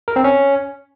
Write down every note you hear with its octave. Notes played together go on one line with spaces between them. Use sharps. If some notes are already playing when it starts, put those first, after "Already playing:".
A#4
C4
C#4